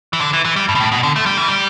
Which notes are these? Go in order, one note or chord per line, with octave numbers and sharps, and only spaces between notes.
E3
D3
E3
E3
G3
G2
B2
A2
B2
D3
A3
G3
E3
G3